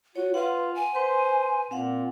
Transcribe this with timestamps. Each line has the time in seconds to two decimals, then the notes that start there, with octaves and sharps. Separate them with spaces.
0.16 F4 F#4 C#5
0.34 F4 B4 F#5 C6
0.75 G#5
0.95 B4 C5 C6
1.71 A#2 C4 F5 F#5